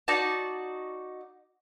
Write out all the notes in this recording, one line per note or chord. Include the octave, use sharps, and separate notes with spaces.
D#4 F#4 D5 A5